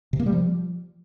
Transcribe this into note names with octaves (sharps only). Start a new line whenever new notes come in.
C3
A#3
G3
F3